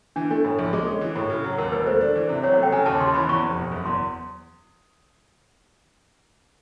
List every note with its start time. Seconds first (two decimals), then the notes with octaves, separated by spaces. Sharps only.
0.16 E3 D4
0.31 A3 D4
0.45 A2
0.59 A#1
0.73 G#3 G#4
0.87 C#4 A4
1.01 E3
1.16 A2
1.30 C#3
1.44 F#3
1.58 D#2 A#4
1.72 E1 B4
1.87 A3 C5
2.01 D4
2.16 E3
2.29 C3
2.43 F#3 C#5
2.54 F#5
2.58 A3
2.63 G5
2.72 C#3 G#5
2.86 D#2 A5
3.00 C#3 C6
3.14 E3 B5
3.29 E2 C#6
3.43 F1
3.57 B2
3.71 F#1
3.86 E2 C6